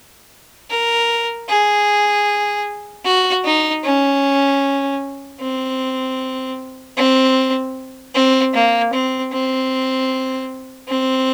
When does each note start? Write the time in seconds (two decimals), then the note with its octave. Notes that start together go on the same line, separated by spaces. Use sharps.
0.70 A#4
1.49 G#4
3.05 F#4
3.44 D#4
3.84 C#4
5.40 C4
6.97 C4
8.14 C4
8.54 A#3
8.93 C4
9.32 C4
10.88 C4